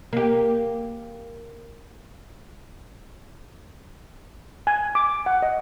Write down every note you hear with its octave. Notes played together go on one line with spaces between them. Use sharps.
A#3 G4
G#5
D6
F#5
D#5